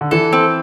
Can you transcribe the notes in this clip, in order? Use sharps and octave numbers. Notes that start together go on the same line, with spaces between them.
D3
E3 A4
C4